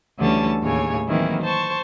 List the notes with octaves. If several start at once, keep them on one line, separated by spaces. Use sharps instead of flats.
D2 D3 E3 G3 C#4 A5
D#2 A2 C#3 C#5 G#5
D#3 E3 F#3 A#3 C4 E4
C5 A5 C#6